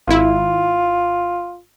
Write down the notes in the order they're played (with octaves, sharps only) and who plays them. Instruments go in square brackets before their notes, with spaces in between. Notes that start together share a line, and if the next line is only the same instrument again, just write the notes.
[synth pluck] G#1 E4 [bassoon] F4